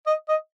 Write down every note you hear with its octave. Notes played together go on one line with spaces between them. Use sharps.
D#5
D#5